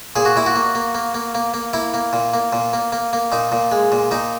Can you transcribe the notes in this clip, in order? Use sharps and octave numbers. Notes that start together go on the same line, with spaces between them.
A#2 G#4
F#4
A#2 E4
F#4
A#3
A#3
A#3
A#3
A#3
A#3
A#3 E4
A#3
A#2
A#3
A#2
A#3
A#3
A#3
A#2 D#4
A#2
G#3
A#2
A#2 D#4